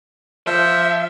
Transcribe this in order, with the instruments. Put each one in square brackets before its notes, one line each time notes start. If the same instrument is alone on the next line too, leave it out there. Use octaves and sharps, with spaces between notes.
[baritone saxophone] F3 [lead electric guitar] E5